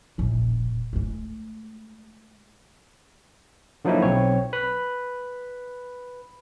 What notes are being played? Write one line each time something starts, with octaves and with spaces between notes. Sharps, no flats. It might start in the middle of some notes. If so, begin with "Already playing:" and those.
E1 A#1
G#3 A3
D3 F3 F#3 A#3 D#4 E4
B1 C4 C#5
B4 B5